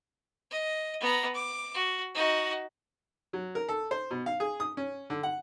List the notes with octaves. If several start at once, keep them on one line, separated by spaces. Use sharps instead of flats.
D#5
B3 A#5
D6
F#4
D#4 F#4
F#3
A#4
A4
C5
B2
F5
G#4
D#6
C#4
D3
F#5